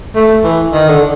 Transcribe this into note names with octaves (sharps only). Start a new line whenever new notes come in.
A3
E3
D#3
D3